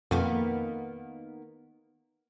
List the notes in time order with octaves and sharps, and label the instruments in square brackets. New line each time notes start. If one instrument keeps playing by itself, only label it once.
[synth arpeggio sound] F2 [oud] D#3 A#3 B3